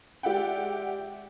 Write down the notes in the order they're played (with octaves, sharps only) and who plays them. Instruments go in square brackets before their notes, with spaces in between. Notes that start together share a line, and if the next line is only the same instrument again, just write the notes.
[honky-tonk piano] G#3 G4 D5 E5 F#5 G5